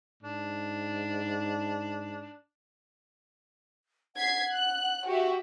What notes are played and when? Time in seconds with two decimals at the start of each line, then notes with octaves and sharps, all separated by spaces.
0.23 G#2 D4
4.16 F#5 G#6 B6 C7
4.52 F#6
5.06 F#4 G4 E5